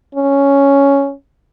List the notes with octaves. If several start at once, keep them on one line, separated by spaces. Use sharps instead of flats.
C#4